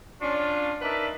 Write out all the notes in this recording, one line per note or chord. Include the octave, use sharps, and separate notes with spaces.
C#4 D4 F4
D4 D#4 A#4 B4 D5 E5